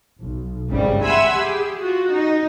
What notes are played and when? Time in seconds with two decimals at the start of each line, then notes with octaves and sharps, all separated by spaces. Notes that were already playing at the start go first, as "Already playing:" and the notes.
0.20 B1
0.70 G1 C2 G#2 C#3 G3
1.02 E5 F#5 G#5 B5 C6 E6
1.39 G4 G#4
1.80 F4 F#4
2.12 D#4